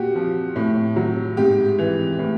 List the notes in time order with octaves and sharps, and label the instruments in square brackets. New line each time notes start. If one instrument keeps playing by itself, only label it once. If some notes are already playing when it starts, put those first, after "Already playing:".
Already playing: [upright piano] A#2 F#4 G4
F3
A2
F#3
G#2 G4
E3
A2